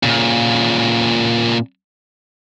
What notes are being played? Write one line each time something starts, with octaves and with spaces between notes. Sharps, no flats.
A#2 C#3